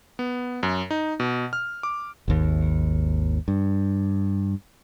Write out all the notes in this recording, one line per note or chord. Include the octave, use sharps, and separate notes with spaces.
B3
F#2
D#4
B2
F6
D6
G#1 D#2
G2